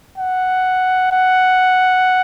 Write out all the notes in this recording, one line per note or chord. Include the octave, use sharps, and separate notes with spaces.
F#5
F#5